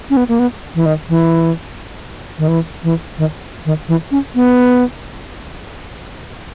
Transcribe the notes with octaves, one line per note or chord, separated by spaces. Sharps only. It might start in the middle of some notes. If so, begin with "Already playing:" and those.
C#4
B3
A#3
B3
E3
D#3
E3
D#3
E3
E3
D#3
D#3
E3
C#4
B3